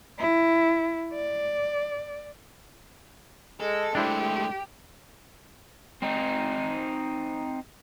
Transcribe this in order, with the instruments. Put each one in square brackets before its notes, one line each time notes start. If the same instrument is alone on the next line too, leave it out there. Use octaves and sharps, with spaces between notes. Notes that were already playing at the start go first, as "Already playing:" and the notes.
[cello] E4
D5
[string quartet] G#3 [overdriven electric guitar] A4
[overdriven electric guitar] G#3 A3 [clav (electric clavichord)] D4 E4 C5 [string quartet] G4
[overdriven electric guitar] C4 D#4